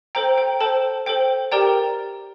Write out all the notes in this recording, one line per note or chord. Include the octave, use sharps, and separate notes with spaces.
A4 C5 G5 A#5
G5
A4 C5 G5 A5
A4 C5 G5
G4 A#4 D5 G5 A#5